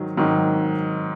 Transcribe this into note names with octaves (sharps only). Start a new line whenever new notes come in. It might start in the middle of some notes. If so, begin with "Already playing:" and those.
Already playing: G#2 D#3 F#3
G#2 D#3 F#3